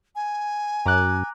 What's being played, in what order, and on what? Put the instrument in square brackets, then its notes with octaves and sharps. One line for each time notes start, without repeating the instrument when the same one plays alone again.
[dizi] G#5
[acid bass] F#2 [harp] A#5 D6 F#6